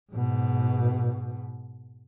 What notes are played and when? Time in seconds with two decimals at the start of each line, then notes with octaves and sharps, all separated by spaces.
0.12 G#2 B2